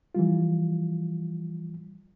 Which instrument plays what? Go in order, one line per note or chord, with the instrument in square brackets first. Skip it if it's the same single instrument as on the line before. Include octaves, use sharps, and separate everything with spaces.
[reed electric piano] E3 F3 G3 F4